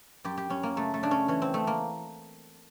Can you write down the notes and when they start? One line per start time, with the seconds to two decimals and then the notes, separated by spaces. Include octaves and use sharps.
0.24 F#2 G4
0.38 G4
0.50 F#2 C#4
0.63 A#3
0.76 C#3 A3
0.94 A3
1.03 C#3 D4
1.11 C#4
1.28 E3 C#4
1.42 C4
1.54 C#3 A3
1.67 A#3